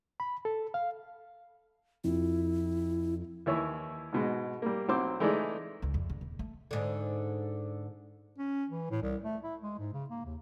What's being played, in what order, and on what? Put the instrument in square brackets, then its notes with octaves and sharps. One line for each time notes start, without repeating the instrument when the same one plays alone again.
[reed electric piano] B5
A4
F5
[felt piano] F2 [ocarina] E4
[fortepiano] D#2 E3 E4 C#5
G#2 B2 G#3
G3 A#3
B1 F#3 C4 C5 D6
E3 G#3 A3 D#4 G#4 D5
[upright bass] C#2
F2
D3
D#1
A3
[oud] G#2 D3
[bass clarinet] C#4
E3
A2
C2
A3
E4
G#3
G#2
C#3
A#3
D#2